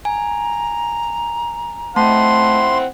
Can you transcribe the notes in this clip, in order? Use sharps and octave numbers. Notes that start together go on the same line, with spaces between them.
G#5 A#5
A3 C4 E4 F#5 A5 C6